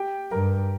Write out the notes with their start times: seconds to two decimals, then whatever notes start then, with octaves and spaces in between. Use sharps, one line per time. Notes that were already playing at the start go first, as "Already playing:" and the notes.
Already playing: G4 G5
0.31 G2 A#4 A#5